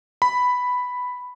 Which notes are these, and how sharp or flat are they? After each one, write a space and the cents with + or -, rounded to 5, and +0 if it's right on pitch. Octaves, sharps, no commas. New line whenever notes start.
B5 +5